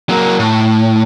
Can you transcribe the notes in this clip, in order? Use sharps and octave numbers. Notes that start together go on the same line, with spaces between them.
F#3 A#3
A2